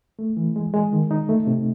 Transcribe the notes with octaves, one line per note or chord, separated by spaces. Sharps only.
A3
E3
G#3
G#3
D#3
D#4
A3
C3